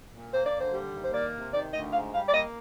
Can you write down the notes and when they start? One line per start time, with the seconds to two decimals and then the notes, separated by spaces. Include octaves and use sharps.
0.12 A#2
0.32 A#3 C5
0.46 D5
0.53 D3
0.60 C5
0.72 G3
0.93 D#2
1.04 C5
1.12 A#3 D5
1.33 C3
1.53 D#3 D5
1.73 D2 D#5
1.93 G#2 F5
2.14 G3 F5
2.28 D5
2.33 A#3 D#5